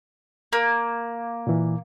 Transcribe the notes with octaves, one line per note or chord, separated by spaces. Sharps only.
A#3
A#2 E3